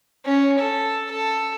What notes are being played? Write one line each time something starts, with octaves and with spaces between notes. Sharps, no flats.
C#4
A4
A4